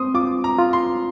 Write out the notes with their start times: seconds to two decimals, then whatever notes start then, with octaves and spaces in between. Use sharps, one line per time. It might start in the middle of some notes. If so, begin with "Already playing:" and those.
Already playing: C4 C5 C6 D#6
0.14 F4 D6
0.44 A#5
0.59 F4
0.73 C6